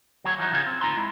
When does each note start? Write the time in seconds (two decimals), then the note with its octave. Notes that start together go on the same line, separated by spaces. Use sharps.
0.24 D#2 F#3 G#4 C#5
0.38 E3 F3 D#4 F#4
0.52 C#3 F4 G4 G#4
0.66 C4
0.81 D2 D#4 F4 A#5 C6
0.96 G#3 E4